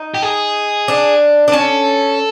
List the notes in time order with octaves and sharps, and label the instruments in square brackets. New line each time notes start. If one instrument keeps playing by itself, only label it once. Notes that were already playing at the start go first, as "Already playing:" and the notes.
Already playing: [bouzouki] D#4
[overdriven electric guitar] G4
G#4
[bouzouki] D4
D4
[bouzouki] C#4 [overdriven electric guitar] A4